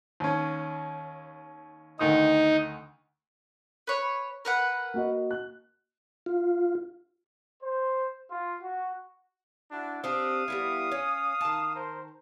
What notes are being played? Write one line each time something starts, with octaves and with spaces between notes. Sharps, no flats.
D#2 C#4
D2 D#3 D#4 D#6
B4 C#5
A#4 B4 F#5
A#3 F#4 D#5
F#6
F4
C5
F4
F#4
D4 E4 F#4
C4 D4 G4 F5 D#6
G3 B3 E4
C#4
D#3 A5
A#4 C5